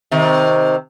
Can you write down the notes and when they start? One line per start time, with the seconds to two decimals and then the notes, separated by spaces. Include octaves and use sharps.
0.11 C3 D#3